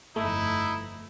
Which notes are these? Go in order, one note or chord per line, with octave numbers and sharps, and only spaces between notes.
G1 F2 A3 D#4 E4